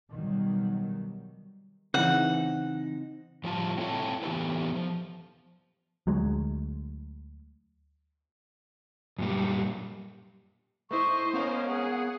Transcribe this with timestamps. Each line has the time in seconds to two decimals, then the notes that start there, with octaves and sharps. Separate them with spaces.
0.11 B2 D#3 F#3 G3
1.94 C#3 E3 C4 D#4 F#5
3.44 A2 F3 G3 F4 G5 A5
3.78 C4 E4 A4 C#5 F#5 A5
4.23 E3 B3 C#4 G4 A4 B4
4.75 F3
6.07 D2 F#3 G#3
9.19 F#2 A#2 G3
10.91 A3 E4 C5 D#5 C#6
11.33 B3 C#4 A#4 F5
11.67 G#4 F#5